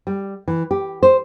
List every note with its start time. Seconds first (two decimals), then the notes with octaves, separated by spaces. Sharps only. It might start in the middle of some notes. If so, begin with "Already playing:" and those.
0.07 G3
0.48 E3
0.71 G4
1.03 C5